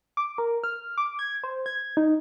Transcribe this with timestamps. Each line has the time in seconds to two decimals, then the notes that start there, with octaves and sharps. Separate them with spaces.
0.17 D6
0.38 A#4
0.64 F6
0.98 D6
1.19 G#6
1.44 C5
1.66 G#6
1.97 D#4